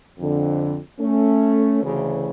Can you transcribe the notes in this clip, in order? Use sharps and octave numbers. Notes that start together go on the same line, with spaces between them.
F2 D3
A3 C#4
D2 C#3 E3